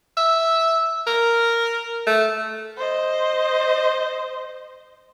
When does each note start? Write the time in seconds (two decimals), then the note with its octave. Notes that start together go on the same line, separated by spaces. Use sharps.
0.17 E5
1.07 A#4
2.07 A3
2.77 C5 D#5